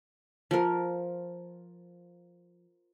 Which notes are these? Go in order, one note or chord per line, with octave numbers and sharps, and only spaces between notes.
F3 A#4